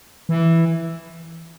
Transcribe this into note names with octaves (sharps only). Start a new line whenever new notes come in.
E3